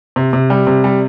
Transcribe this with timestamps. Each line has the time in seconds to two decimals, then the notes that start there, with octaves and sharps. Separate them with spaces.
0.16 C3
0.33 C3
0.50 G3
0.67 C3
0.84 G3